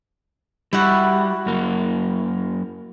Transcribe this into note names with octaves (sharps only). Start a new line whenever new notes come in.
G3 E4 F#4
F#2 A#3